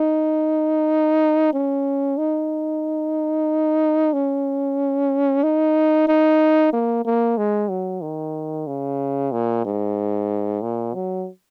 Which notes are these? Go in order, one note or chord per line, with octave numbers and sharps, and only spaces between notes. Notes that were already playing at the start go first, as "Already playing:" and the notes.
Already playing: D#4
C#4
D#4
C#4
D#4
D#4
A#3
A#3
G#3
F#3
D#3
C#3
A#2
G#2
A#2
F#3